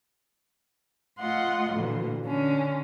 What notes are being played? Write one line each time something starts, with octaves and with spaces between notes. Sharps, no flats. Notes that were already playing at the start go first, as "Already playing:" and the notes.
A3 F4 D#5 F#5 C6
D2 A#2 D3 E3
D3 C#4